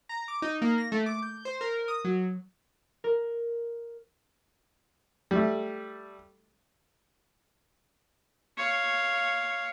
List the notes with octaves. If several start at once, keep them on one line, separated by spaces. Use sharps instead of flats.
A#5
D6
D#4
A#3
A#6
A3
D6
G6
C5
A#4
D#6
F#3
A#4
G3 A3
C#5 F5